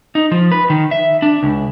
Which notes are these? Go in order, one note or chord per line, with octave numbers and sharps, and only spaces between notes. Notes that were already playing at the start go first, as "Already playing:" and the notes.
D#4
F3
B4
D#3
E5
D4
C#2